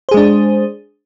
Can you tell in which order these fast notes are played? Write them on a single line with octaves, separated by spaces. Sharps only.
C5 G#4 G#3 D4